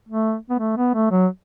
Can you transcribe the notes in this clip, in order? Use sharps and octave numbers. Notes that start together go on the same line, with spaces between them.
A3
B3
A3
B3
A3
F#3